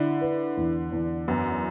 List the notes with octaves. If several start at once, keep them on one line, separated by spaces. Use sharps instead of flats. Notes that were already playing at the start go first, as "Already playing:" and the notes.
Already playing: D3 E4
B4
E2
E2
F#2 B3